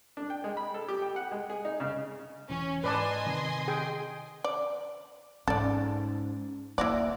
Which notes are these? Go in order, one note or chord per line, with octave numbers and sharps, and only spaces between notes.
D4
G5
G#3
B5
A4
G4
G5
F#5
G#3
G#4
D#4
C#3
E1 E3 C#4
G#2 B4 D5 D#5 G#5 A5 C6
C3 D#3 C4
G#4 G5
D5
G#2 C#4 A4 D5
D1 A#3 E4 F#4 D5